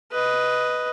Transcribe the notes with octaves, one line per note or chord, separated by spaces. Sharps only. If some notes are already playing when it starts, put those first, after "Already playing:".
B4 D#5